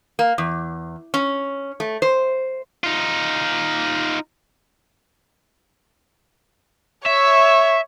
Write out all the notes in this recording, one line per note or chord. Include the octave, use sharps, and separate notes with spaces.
A#3
E2
C#4
A3
C5
D#4 F4
C#5 E5